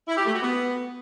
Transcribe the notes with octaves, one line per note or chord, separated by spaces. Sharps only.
E4
G4
A3
F#4
B3